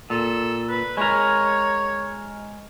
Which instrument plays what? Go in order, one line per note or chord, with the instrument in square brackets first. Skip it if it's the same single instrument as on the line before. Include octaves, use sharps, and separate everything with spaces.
[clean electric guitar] A#2 [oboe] A4
[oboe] B4
[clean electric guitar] G#3 A#4 [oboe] C#5